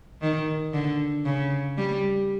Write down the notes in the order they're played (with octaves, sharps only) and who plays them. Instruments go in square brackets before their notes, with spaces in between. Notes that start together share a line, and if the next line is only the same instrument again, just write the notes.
[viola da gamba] D#3
D3
C#3
G3